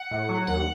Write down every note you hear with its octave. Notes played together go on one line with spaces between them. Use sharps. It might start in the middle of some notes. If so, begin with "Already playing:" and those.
Already playing: F#5
A2
F#3
D#2 F#5